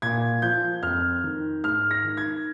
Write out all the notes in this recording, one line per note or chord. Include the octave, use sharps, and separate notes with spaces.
A#2 G#6
F3 G6
F2 F6
D#3
G#2 F6
A#6
D#3
G#6